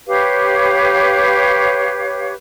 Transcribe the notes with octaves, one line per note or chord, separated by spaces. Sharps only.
G4 B4 C#5 F5